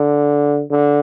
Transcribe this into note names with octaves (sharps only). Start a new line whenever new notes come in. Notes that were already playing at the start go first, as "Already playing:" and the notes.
Already playing: D3
D3